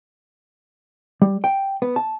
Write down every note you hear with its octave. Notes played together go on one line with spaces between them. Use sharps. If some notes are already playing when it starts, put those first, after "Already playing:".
G3
G5
B3
A5